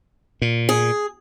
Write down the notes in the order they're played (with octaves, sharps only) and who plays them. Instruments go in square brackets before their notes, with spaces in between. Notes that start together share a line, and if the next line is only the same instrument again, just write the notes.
[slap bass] A#2
[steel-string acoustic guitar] G#4